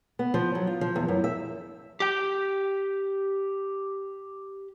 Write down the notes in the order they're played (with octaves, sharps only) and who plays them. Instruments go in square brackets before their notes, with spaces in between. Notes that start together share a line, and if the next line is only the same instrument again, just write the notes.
[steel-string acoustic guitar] B3
F3
F#3
F4
F3
E2
F#2
E5
[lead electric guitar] G4 G5